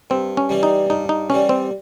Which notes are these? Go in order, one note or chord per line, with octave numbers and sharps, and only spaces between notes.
G2 C4
C#4
E3 G3
D#4
G2 D#4
D#4
E3 G3 C#4
C4